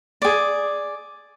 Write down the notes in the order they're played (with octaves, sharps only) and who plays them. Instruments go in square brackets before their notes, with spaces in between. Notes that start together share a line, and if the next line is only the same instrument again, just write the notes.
[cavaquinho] G#4 D5